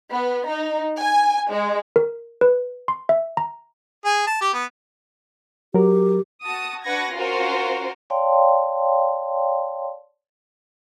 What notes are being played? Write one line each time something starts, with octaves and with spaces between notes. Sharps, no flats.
B3
D#4
G#5
G#3
A#4
B4
C6
E5
A#5
G#4
A5
G4
B3
F#3 G4 A#4
F#4 A5 D#6
D4 F#4 B4 F#5 G#6 A#6
C#4 F4 F#4 A#4 C5
C#5 D5 F5 G5 A5 C6